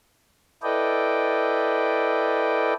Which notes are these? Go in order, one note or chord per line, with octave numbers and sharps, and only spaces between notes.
E4 A4 B4 D5 D#5 G5